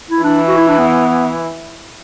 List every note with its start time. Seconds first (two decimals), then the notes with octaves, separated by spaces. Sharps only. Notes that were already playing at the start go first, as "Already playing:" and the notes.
0.11 E4
0.23 E3 D4
0.48 F#4
0.58 E4
0.68 D4
0.78 B3